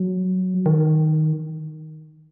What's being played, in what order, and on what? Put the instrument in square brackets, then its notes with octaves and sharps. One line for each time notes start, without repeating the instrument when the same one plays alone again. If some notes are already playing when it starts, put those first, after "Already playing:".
Already playing: [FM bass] F#3
D#3